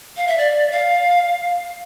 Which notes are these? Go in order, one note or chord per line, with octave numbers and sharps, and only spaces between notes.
F5
E5
D5
F5